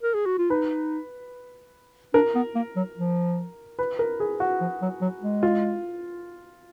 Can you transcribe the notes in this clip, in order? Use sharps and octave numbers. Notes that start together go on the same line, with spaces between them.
A#4
G#4
F#4
F4
D#4 B4
D4 A#4
B3
A#3
F#3
F3
B4
A#4
G#4
F#4
F3
F#3
F#3
G#3
F4